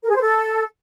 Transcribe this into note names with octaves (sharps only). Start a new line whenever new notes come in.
A#4
G#4
C5
A4